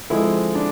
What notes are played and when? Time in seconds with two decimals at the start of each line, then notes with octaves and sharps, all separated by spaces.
0.10 D3 F3 G#3 C4 E4
0.55 D4